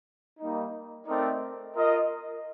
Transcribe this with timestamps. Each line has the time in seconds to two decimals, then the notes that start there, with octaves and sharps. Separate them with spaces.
0.40 G3 A#3 D#4
1.07 A3 C4 D#4 A#4 D5
1.74 F4 A#4 D#5